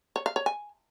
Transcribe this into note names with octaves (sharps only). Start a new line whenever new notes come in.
C#5
F5
C#5
G#5